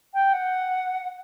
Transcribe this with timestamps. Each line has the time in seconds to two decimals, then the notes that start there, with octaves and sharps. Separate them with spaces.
0.14 G5
0.33 F#5